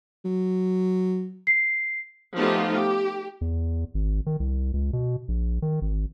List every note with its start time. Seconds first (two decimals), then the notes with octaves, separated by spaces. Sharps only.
0.25 F#3
1.47 C7
2.35 F3 A3 B3 D#4 F4 G4
2.74 G4
3.41 E2
3.94 G#1
4.26 D#3
4.40 C2
4.74 C#2
4.93 B2
5.28 A#1
5.62 D#3
5.82 G#1